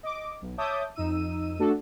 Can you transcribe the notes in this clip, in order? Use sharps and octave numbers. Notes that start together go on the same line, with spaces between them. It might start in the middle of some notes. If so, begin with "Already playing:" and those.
D#5 D6
B1
C#5 E5 A5 D6 D#6 G6
F2 D#4 E6 D#7
A3 D4 F#4 A4